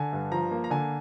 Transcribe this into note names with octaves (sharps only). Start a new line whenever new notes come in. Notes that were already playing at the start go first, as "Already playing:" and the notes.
Already playing: D3 G#5
G2
F3 A#5
A#3
A#5
D3 G#5